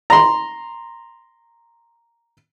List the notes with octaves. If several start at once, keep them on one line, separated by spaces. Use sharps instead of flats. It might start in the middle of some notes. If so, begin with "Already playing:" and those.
A#5 C6